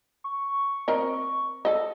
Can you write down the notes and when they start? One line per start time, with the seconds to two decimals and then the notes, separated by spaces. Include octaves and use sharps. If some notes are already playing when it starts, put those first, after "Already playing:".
0.24 C#6
0.88 C4 A#4 D#5
1.65 A4 D#5